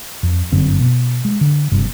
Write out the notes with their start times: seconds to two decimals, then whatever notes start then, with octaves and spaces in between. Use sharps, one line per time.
0.23 F2
0.52 G1 F#2 D3 C4
0.81 B2
1.25 G#3
1.41 D3
1.72 F#1 G2 C3